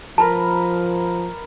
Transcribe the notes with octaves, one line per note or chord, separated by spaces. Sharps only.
F3 A#4 B4 A5